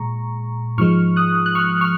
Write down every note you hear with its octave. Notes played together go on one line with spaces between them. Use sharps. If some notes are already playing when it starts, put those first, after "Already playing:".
Already playing: A#2 G#3 A#5 C#6
G#2 F3 G#3 C#6 F6
D#6 F#6
F#6
C#6 F6
C#6 F6